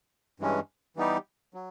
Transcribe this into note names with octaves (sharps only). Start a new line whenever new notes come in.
G2 E3 G#3 C#4
E3 G3 B3 D#4 G4
F#3